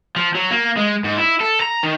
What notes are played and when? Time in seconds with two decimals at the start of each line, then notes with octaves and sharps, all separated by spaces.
0.16 F3
0.35 F#3
0.50 A#3
0.77 G#3
1.04 G#2
1.18 E4
1.40 A4
1.61 A#5
1.83 D#3